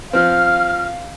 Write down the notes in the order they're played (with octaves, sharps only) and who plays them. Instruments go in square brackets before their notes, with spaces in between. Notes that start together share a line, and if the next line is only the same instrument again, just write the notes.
[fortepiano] F3 C4 [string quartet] F5 [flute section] F6